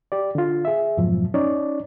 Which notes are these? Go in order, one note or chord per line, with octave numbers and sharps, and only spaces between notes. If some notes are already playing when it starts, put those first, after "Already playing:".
G4 D5
D3 F4
G#4 E5
F2 G#2 B2 F3 F#3
C#4 D#4 C#5 D5